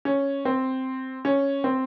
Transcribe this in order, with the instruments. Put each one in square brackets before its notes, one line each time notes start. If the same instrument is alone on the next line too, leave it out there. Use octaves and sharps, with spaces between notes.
[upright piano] C#4
C4
C#4
C4